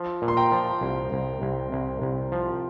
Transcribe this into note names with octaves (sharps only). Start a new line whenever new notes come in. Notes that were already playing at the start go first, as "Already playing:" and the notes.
Already playing: F3
A#2
C6
G5 A#5
F3
C2
C2
C2
C2
C2
F3